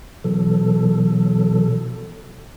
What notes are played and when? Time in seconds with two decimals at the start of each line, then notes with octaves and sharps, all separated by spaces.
0.24 B2 E3 F#3 A4